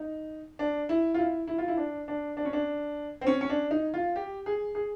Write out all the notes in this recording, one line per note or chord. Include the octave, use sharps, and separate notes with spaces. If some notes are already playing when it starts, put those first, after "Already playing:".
Already playing: D#4
D4
E4
F4
E4
E4
F4
E4
D4
D4
D4
C#4
D4
C4
C#4
C#4
D4
D#4
F4
G4
G#4
G#4